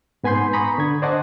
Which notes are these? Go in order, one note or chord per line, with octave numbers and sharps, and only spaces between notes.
G#2 B3 G#5 B5 C6 G6
A#5 B5 C#6 D#6
D3 G#6
C5 D5 D#5 F#5 A5